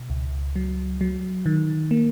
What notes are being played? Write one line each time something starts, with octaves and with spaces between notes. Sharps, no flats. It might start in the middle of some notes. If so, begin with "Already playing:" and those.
Already playing: B2
C#2
F#3
F#3
D#3
A#3